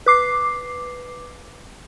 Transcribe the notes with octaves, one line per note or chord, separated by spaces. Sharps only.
B4 D6 C7